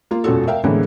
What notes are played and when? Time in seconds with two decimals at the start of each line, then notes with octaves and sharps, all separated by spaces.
0.11 A#3 F4
0.24 E1 F#2 F4 F#4 A4
0.47 A#4 E5 F5 G5
0.64 A2 D3 E3 G#3 A#3 B3